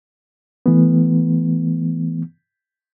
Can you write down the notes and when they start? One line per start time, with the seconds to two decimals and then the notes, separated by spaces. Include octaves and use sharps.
0.66 E3 A3 B3